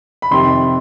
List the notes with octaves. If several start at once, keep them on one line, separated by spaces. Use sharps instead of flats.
B5
F2 C3 D#3 C6